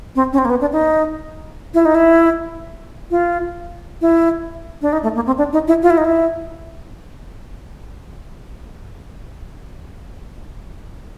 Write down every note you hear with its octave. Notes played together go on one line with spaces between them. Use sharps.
C4
C#4
C4
A#3
B3
D4
D#4
E4
D#4
E4
F4
E4
D4
D#4
A3
A#3
C4
D4
D#4
E4
F4
E4
D#4
E4